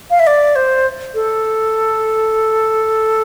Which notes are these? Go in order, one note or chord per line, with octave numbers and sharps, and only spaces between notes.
F5
E5
D5
C5
A4